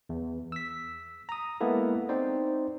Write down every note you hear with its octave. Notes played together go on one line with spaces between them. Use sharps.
E2
E6 B6
A#5 D#6
G#3 A#3 B3 E4 A4
C4 D#4 C5 D5